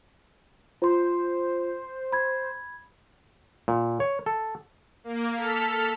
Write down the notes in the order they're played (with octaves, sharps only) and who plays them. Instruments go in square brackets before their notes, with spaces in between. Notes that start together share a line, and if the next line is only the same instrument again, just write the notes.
[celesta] F4 C6 [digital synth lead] C5
[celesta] B5 G#6
[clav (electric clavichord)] A#2
C#5
A4
[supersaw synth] A#3
A4 F6 B6